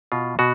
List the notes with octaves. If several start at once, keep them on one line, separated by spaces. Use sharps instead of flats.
B2 F4
B2 F#4